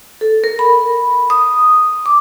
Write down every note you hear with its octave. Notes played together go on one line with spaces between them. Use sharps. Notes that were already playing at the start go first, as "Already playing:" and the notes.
A4
A#4
B5
D#6
D6